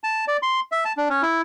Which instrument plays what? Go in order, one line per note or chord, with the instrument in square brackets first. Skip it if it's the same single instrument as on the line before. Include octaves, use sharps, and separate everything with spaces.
[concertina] A5
D5
C6
E5
A5
D4
C#4
E4